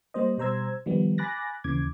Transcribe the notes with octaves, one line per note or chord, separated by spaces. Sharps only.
G3 A#3 C5 D#5
B2 G3 C5 A#5 E6 G#6
D#3 F3 G3 B3
G#5 B5 D6 F#6 A6 A#6
D#2 C#3 E3 D6 G#6